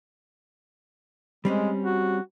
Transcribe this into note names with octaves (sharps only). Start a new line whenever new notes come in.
G3 G#3 C4 C#4
F#4